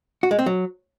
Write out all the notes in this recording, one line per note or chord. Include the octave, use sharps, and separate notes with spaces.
F#4
G#3
C4
F#3